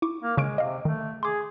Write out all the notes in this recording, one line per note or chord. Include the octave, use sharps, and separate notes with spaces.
E4 C#6 D6
A#3
C#3 G#3 C#6 D7
C3 D#5 F5
D#3 A3
G#4 C6 D6